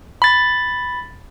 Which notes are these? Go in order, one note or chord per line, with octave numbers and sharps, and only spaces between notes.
B5 A6